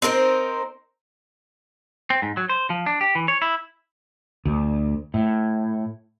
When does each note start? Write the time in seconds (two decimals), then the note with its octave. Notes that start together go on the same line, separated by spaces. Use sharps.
0.02 C4 D#4 A#4 C5
2.10 C4
2.22 G#2
2.37 F#3
2.49 C5
2.70 F3
2.86 D4
3.01 G4
3.15 E3
3.28 C#5
3.42 E4
4.45 D2
5.14 A2